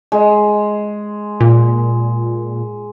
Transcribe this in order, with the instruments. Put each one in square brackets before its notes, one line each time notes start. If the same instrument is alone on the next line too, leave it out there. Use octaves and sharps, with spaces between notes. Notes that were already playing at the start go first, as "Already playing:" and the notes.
[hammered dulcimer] G#3
[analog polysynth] A#2